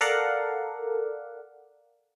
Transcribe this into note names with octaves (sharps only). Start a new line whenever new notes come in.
A4 A#4 D5 F5 F#5